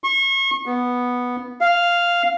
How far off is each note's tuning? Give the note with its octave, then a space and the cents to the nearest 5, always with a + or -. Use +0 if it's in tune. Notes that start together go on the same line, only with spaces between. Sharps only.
C#6 -35
B3 -5
F5 -5